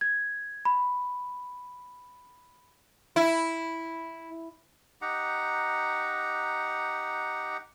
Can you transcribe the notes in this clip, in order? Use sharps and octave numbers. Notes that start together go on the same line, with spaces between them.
G#6
B5
E4
D#4 G4 F#5 A#5